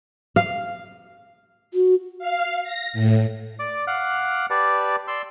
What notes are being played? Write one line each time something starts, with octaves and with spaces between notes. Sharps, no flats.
F5
F#4
F5
A#6
A2
D5 D6
F5 F#5 D6 F6 F#6
G4 B4 D5 A5
D5 C6 E6